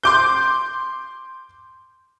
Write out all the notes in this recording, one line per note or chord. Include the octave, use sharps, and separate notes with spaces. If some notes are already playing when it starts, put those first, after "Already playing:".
C6 D6 G6